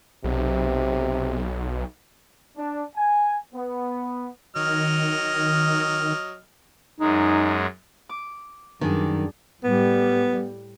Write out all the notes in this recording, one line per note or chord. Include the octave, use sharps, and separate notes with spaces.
B1 C3
D4
G#5
B3
D#3 F#3 D#5 F6
F#2 G#3 D#4
D6
F#2 D#3 G3 D4 G#4
A2 G3 B3